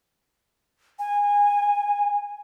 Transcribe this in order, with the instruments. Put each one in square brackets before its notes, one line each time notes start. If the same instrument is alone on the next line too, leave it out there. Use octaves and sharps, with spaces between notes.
[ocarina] G#5